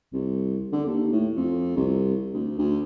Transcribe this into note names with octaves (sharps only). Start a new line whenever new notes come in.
C2
D3
D#2
A2
F2
C2
D2
D2